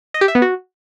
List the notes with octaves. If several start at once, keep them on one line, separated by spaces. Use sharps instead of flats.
D#5
G4
E5
B3
F#4